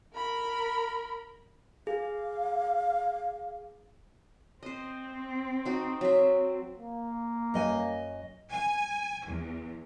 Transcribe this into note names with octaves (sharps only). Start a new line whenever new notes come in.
A#4 B5
G#4 F5
C4 C5 D#5
D#4 F#4
F#3 E5
A#3
F#2 D#5 G#5
G#5
E2